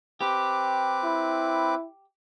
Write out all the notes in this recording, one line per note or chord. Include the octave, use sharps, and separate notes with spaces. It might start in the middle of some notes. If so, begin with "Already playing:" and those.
C4 G4 B4 D6
E4